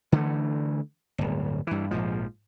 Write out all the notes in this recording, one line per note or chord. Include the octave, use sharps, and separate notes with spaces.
D3 E3 A3
D1 G1
G2 E3
A#1 G#2 F3